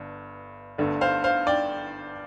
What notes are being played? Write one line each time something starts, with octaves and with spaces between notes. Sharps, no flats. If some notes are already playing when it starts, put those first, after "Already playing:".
Already playing: G1 G2 D3
G1 G2 D3 A3
C5 F5
C5 F5
D5 G5